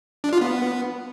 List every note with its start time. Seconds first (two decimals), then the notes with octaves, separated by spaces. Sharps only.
0.24 D4
0.33 F4
0.41 B3